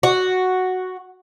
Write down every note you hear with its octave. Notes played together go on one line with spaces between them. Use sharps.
F#4